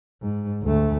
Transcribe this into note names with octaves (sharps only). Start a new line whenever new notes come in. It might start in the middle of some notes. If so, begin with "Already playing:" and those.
G#2
D2 A3